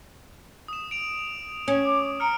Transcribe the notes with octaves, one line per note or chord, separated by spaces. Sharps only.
D#6 E7
D7 F7
C#4 D#6
D6
A#5 F6 C#7 D7